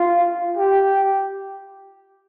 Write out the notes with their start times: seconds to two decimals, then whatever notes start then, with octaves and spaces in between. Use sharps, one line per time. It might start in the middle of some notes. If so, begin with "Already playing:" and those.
Already playing: F4
0.57 G4